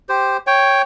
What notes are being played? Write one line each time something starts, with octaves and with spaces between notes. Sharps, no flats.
G4 C5
C#5 G5